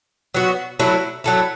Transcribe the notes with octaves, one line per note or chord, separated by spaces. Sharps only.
F#3 B3 F#4
F#3 A3 E4
F#3 A3 E4